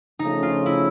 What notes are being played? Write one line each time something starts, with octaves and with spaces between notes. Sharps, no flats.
C#3 F3 A3 D#4
F4
E4